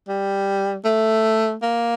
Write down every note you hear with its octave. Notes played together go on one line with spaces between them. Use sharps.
G3
A3
A#3